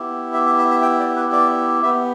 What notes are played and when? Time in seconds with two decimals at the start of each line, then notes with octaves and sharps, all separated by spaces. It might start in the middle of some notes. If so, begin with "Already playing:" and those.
Already playing: B3 E4 G4
0.34 E5
0.46 E5
0.59 E5
0.71 E5
0.82 G5
1.00 D5
1.16 B4
1.33 D5
1.82 B3 G4 E5